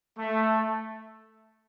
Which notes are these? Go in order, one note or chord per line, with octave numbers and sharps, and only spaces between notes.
A3